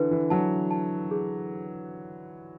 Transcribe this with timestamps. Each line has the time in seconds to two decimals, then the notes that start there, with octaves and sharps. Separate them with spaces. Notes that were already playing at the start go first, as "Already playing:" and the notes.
Already playing: D3 E3 B4
0.11 E3
0.30 F#3 A5
0.71 A5
1.11 G#4